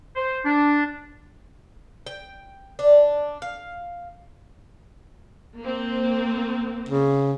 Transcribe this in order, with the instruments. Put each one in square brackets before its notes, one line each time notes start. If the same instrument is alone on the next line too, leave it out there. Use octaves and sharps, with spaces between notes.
[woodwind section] C5
D4
[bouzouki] G5
D4
F5
[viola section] A#3 C4
[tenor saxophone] C#3